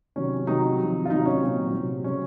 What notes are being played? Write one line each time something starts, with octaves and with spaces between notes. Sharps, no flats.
C3 D#3 F#3 C#4
C3 D#3 F#3 D#4
C3 F3
F4
C3 D#3 F#3 D#4
C#4
A#2 F#3 C4
C3 F#3
C#3 F#3 C#4